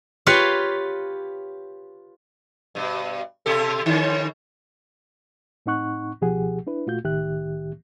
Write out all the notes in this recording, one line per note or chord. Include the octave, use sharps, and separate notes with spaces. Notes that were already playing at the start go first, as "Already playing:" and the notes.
F4 G4 B4 C#5 F5
G2 B2
B2 G4 A4
D3 D#3 C#4
A2 C4 D#4 F#5 C#6 F#6
C#2 B2 F3 G4 G#4 F#5
D4 E4 B4
A#2 A3 F4 F#4 G6
C2 A2 D#3 G4 E5 F#6